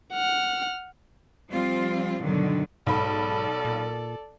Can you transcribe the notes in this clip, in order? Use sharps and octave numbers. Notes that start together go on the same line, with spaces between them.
F#5 F6
F3 G3 C4 F4
G2 B2 D3 D#3 F#3
B1 G#2 A4 D5 B5
A#2